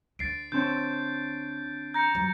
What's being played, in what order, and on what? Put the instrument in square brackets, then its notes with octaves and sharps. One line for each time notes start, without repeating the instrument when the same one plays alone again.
[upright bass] D2 [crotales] A6 C7 D7
[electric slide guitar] D3 C4 C#5 [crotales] G6
[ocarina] A#5 [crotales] G6 A#6 C#7
[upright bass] F2 F#3